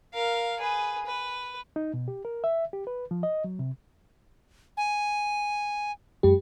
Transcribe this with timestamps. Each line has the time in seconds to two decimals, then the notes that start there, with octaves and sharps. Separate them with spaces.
0.14 A#4 F5
0.60 G#4 B4
1.06 B4
1.76 D#4
1.94 B2
2.08 G4
2.25 A#4
2.44 E5
2.73 G4
2.87 B4
3.11 F3
3.23 D#5
3.44 F#3
3.59 C3
4.77 G#5
6.23 F#2 G#3 G4